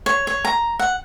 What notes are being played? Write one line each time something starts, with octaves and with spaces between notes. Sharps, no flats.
C#5
C#5
A#5
F#5